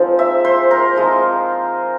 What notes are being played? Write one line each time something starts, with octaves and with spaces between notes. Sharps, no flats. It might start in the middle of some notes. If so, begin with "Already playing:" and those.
Already playing: F3 G#3 C4 D#4
E5
C5
A#4
F3 G#3 C4 F4